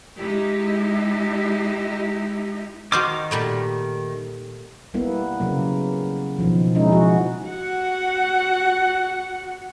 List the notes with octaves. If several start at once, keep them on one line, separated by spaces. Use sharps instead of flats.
G#3 D#4 E4 G4
D#3 F#4 C5 D#5 D6 F6
A#2 G3 A3
G3 A#3 B3 E4
C#3 F#3 A#3
B2 D#3 F3
G#3 C#4 D#4 E4
F3 F#4
F#4 F#5